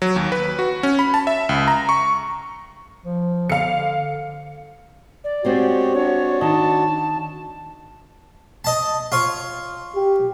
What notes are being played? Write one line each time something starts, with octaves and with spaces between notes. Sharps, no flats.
F#3
D#2
B4
F#4
C#4
B5
A5
E5
C#2
A#5
C#6
F3
D3 F5 C#7
D5
G#3 C4 F#4 G4 C5 C#5
D4 F#4 C#5
D#3 D#5 A5
D#5 A5
F4 C#5
G4